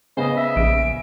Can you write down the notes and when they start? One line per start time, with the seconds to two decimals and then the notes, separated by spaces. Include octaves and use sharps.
0.17 C#3 B3 C5 D#5
0.37 E5
0.56 A#1 D7